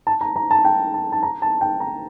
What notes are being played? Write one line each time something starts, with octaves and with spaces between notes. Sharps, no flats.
A5
A#5
A#5
A5
G5
A5
A5
A#5
A5
G5
A#5